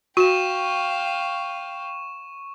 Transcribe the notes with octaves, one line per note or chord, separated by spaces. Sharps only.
F#4 F5 G5 C#6 E7